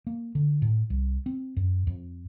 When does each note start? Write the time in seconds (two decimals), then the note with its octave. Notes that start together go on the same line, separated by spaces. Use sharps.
0.07 A#3
0.35 D3
0.62 A2
0.90 C2
1.26 C4
1.57 F#2
1.87 F2